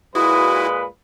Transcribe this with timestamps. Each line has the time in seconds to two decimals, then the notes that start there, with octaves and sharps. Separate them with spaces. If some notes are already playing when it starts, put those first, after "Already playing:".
0.15 A#2 G#3 E4 F#4 B4 D#6